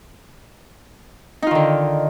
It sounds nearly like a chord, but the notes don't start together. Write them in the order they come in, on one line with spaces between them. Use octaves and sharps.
D#4 F4 D#3 D3